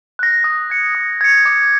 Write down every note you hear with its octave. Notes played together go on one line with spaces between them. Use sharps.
F#6 A#6
D#6
G#6 C#7
D#6
G#6 C#7
D6